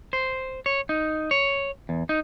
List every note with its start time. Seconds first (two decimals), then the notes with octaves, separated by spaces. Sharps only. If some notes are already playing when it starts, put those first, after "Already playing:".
0.13 C5
0.66 C#5
0.89 D#4
1.31 C#5
1.89 E2
2.09 D#4